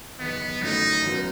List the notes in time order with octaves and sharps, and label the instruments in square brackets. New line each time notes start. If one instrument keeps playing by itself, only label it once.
[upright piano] F#1 E2 D#3 [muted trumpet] B3
[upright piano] G1 F#2 F#3 A3 E4 [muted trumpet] D#4
[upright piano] F#2 F#3 B3 E4